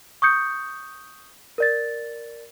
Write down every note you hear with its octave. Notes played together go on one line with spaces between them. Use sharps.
C#6 D#6 G6 C#7
A#4 D5 A6